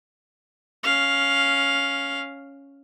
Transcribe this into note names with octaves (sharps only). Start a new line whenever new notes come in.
C#4 F5